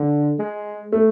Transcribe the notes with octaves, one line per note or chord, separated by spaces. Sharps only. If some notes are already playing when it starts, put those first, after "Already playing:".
Already playing: D3
G#3
A3